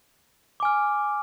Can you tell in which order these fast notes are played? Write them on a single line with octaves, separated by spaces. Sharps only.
D6 G#5 F6